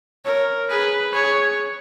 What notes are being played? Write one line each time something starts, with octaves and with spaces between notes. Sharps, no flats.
A#4 C#5
G#4 B4
G#4 C#5